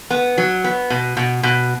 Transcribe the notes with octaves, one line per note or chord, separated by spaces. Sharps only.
B3
F#3
B3
B2
B2
B2